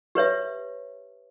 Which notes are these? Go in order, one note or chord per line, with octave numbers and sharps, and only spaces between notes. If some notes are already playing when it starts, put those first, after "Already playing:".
G4 B4 C#5 E5